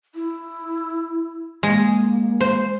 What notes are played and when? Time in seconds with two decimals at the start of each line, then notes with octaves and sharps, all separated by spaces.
0.15 E4
1.63 G#3 A#3
2.40 C5